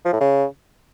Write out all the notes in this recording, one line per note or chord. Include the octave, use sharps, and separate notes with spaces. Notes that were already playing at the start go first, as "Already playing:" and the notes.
F3
A2
C#3